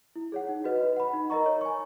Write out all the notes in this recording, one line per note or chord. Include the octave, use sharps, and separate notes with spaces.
E4
G#4 C#5 F#5
D#4
F#4 B4 D#5
B4
F#5 B5
D#4
A#4 D#5 A#5 C#6
C#5
G#5 C#6